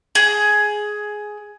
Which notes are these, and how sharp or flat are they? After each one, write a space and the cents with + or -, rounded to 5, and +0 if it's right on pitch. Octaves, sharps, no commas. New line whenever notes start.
G#4 +10